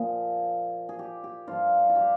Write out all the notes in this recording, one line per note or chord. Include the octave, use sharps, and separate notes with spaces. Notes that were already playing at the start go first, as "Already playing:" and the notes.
Already playing: A#2 F3 G#4
G#4
G4
G4
G2 F3 F4
F4
G4